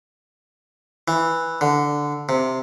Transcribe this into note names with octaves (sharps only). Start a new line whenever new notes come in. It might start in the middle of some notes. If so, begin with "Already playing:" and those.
E3
D3
C3